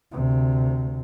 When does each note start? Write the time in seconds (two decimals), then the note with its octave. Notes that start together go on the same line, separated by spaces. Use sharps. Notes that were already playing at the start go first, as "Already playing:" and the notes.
0.12 D2 C3